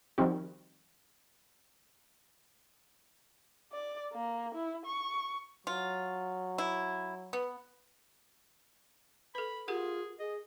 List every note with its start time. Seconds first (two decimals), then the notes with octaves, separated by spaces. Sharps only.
0.18 D#3 F3 G3 C4 D#4 F#4
3.72 D5
4.13 A#3
4.55 E4
4.86 C#6
5.67 F#3 F4
6.58 E4
7.33 B3
9.35 A4 B4 B5
9.68 F4 G4 G#4 A#4 F#5
10.19 G#4 D#5